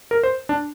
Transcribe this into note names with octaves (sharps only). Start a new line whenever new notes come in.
A#4
C5
D4